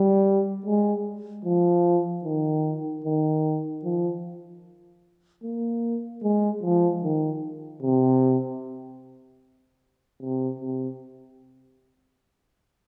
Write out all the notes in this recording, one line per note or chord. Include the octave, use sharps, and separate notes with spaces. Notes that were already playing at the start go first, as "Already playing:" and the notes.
Already playing: G3
G#3
F3
D#3
D#3
F3
A#3
G#3
F3
D#3
C3
C3
C3